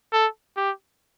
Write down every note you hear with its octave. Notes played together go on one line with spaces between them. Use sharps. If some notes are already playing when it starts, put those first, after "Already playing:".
A4
G4